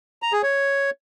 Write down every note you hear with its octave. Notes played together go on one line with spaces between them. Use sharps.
A#5
G#4
C#5